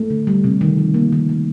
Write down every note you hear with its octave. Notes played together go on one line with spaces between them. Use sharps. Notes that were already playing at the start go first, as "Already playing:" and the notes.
Already playing: A3
D3
G3
C3
D#3
F3
A#3
D#3
A3